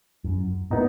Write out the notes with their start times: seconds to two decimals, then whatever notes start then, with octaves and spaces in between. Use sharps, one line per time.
0.24 F#2
0.70 A#2 B3 D#4